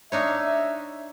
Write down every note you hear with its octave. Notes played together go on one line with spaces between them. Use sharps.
D4 D#4 C#5 E5